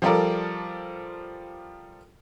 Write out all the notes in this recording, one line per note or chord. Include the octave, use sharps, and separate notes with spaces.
F3 G3 F4 A4 A#4 D5